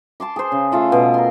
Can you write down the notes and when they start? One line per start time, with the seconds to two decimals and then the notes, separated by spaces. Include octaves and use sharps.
0.20 A5 C6 D6
0.36 G#4 C5
0.52 C#3
0.72 A3 F4 A4
0.92 B2
1.14 A#4 C6